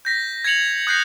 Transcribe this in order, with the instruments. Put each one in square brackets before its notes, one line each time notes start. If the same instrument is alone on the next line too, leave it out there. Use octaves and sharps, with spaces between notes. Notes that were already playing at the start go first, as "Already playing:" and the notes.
[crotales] G6 A#6 B6
G#6 A#6 C#7 F7 F#7
D#6 F#6 G6 A#6 C7 C#7